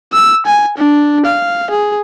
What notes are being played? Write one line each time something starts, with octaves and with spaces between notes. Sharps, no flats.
E6
G#5
D4
F5
G#4